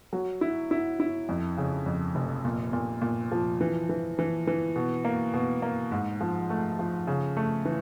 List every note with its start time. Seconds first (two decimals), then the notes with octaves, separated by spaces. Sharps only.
0.13 F#3
0.41 E4
0.71 E4
1.00 E4
1.29 F2
1.57 C#3
1.86 F2
2.15 F1
2.45 A#2
2.73 A#2
3.02 A#2
3.31 F3
3.61 E3
3.89 E3
4.19 E3
4.47 E3
4.76 B2
5.05 A#3
5.34 B2
5.62 A#3
5.92 G#2
6.21 F3
6.50 A3
6.79 F3
7.07 C#3
7.37 A3
7.65 E3